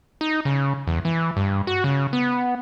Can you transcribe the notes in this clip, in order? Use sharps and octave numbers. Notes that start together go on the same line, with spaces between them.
D#4
C#3
E2
E3
G2
F#4
C#3
B3